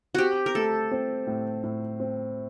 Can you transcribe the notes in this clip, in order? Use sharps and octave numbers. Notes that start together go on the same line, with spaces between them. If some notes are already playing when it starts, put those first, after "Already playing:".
C4 F#4 G4
A#4
A3 A4
C4
A2
A2
C4